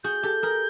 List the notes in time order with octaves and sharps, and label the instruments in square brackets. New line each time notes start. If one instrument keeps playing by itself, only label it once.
[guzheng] F#4 G#4 [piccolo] G6
[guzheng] G4 A4
G#4 A#4